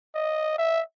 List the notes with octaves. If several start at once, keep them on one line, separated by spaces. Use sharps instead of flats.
D#5
E5